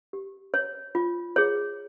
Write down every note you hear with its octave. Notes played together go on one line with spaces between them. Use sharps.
G4
C#5
F4
G#4 C#5